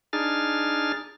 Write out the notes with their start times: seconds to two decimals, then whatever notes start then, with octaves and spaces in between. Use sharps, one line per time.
0.13 D4 D#4 G#4 F6 A6